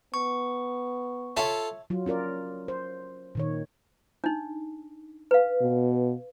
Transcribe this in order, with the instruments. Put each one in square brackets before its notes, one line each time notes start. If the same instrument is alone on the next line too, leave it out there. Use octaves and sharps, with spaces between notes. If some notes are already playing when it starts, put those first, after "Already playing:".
[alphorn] B3 [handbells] C#6
[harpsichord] F4 A4 [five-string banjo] C#5 E5
[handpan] F#3 F4
C#4 F4 A#4 D5
C5
A#2 D#3 C#5
[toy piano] D4 D#4
B4 F5
[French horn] B2